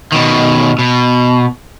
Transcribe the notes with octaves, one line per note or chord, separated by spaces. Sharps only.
B2 D#3
B2